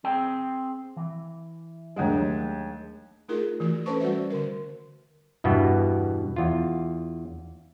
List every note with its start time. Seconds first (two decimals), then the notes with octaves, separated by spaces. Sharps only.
0.04 C4 G#4 G5
0.97 E3
1.96 D#2 F#3 G#3 A3 D4
3.29 A3 D#4 F4 G#4 A#4
3.60 E3 A3 F#4
3.86 C#4 A4 B4 C5 A5 C#6
4.00 G3 F#4 B4 D5 E5
4.30 D3 A#4
5.44 E2 G2 B2 E3 B3
6.36 E2 F4